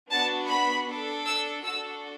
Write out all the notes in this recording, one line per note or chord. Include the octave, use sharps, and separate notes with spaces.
B3 D4 F#4 A5
B5
D4 A4
E6
D4 F#4 A4 E6